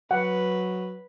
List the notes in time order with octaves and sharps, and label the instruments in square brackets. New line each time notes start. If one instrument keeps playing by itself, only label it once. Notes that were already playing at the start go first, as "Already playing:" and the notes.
[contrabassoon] F#3 [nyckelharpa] B4 [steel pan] F#5